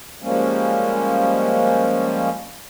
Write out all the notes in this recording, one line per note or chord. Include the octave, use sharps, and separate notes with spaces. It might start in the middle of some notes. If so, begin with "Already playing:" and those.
F3 G3 G#3 A#3 C#4